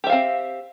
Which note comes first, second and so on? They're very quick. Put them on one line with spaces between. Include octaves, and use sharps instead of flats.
G4 E5 F5 C4